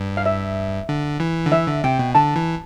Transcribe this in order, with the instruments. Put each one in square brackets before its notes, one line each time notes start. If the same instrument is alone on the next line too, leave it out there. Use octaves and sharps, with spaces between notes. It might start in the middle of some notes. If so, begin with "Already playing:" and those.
Already playing: [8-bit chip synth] G2
[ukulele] F5
E5
[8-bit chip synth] D3
E3
D3
[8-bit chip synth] E3 [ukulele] E5
[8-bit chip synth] D3
[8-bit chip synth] C3 [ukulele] G5
[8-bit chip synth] B2
[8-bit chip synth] D3 [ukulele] A5
[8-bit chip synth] E3